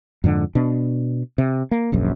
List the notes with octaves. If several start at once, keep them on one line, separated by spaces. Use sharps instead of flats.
F2 G#2 D3
B2 D4
C3
A#3
D#1 A#1 F#2